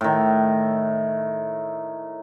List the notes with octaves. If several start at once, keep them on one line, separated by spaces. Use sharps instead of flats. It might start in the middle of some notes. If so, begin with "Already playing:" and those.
A2 D#3